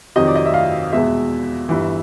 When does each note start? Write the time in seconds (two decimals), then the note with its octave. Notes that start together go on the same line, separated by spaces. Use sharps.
0.16 F2 C3 D#3 F#3 D#5
0.27 D5
0.36 D#5
0.46 E5
0.54 F5
0.92 E2 B2 G#3 E5
1.69 G1 G2 E3